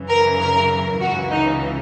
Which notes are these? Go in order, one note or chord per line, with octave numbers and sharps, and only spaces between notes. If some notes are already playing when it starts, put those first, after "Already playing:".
Already playing: F#2 C#3 E3
A#4
A#4
C#2 C#3 E3 F#4
D#4